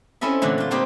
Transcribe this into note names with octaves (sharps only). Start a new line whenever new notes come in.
C4 C#4 E4 A4 D#5 E5
A#2 D3 E3 F#3 A3
D3 F4
G3 A3 A#3 C4 D#4 G4